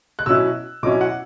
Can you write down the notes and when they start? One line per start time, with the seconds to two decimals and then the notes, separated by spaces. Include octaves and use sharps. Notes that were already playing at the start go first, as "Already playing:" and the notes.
0.19 F#6
0.26 B2 F#3 C#4 E4 E6
0.83 B2 F#3 C#4 E4 D6
1.01 F#5